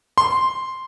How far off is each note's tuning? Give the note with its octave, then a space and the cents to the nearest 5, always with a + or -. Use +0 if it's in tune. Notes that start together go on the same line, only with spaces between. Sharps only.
C6 +0